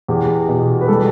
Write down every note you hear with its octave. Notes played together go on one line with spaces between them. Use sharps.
E2 G4
B2
B4
G3 A4